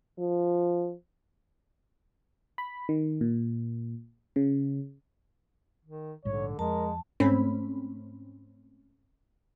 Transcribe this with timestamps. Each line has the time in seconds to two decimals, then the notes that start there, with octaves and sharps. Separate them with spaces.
0.19 F3
2.58 B5
2.89 D#3
3.21 A#2
4.36 C#3
5.85 D#3
6.25 A#1 G#2 D3 G3 C#5
6.59 F2 G#3 A#4 A5
7.20 G#2 A3 C4 C#4 B5